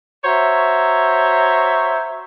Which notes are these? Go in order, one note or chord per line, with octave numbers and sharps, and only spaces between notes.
F#4 C5 C#5 E5 A#5